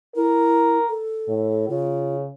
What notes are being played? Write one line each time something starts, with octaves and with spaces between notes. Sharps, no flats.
E4 A#4
A4
A2
C#3 F4